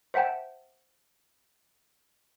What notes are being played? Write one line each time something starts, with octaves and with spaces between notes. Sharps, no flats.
C5 E5 F#5 G5 A5